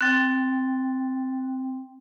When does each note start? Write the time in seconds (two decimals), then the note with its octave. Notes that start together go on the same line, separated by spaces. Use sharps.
0.01 C4 G5 F#6 A6